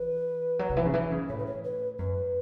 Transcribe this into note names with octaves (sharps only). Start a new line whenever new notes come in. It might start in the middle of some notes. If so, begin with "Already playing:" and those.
Already playing: E3 B4
F#3
C#3
E3
C#3
E3
C#3
A2 C#5
B4
C#5
B4
F#2 B4